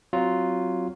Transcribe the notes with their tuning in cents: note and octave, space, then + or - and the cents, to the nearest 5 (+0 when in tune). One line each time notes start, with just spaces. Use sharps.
F#3 +10 C4 +5 F4 +0